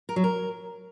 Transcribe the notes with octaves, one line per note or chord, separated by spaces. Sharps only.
A#4
F#3
A#4